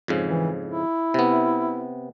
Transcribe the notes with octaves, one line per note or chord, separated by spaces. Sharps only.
F2 G#2 C#3
E3
E4
C3 B3